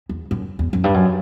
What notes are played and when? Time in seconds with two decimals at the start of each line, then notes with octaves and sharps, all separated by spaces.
0.09 E2
0.31 F#2
0.59 E2
0.73 F#2
0.84 G2
0.94 F#2